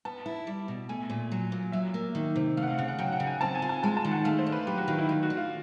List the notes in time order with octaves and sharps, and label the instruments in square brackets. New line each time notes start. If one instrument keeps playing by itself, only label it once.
[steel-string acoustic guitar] B3 [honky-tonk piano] A5
[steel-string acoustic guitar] E4
G3
B2
[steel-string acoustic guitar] A3 [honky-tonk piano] G#5
[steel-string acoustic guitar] A#2
F#3
A#2
[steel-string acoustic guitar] F#3 [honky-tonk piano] E5
[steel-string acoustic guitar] A#3
D#3
C3
[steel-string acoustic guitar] A3 [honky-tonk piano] F5
[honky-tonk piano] F#5
F5
[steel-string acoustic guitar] C#3 [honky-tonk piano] F#5
[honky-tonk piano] F#5
[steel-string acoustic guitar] F#3 [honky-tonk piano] G5
[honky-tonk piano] F#5
[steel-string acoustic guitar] C#3
[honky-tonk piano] G#5
[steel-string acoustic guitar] C4 [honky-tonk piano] A5
[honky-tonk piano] G#5
[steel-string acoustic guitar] F4
[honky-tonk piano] A5
[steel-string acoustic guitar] G#3 [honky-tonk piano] A5
[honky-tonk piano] A5
[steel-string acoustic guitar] D#3
[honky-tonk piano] F#5
[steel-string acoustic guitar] A3 [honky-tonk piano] F5
[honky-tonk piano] C5
[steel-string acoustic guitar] D4
[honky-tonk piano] B4
[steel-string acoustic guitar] F#3 [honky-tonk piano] G4
[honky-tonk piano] F#4
[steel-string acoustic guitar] D#3 [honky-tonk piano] F4
[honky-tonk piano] E4
[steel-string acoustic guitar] A3 [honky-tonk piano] F4
[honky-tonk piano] F#4
[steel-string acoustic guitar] D4
[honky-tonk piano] F4